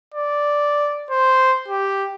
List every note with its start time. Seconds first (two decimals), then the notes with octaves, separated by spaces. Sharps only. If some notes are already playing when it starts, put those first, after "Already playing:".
0.14 D5
1.11 C5
1.68 G4